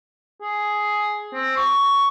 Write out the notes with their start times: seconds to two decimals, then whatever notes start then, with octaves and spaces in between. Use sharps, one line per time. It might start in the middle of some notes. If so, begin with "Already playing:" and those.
0.42 G#4
1.34 C4
1.56 C#6